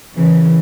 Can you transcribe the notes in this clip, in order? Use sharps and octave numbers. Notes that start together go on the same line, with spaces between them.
C#3 E3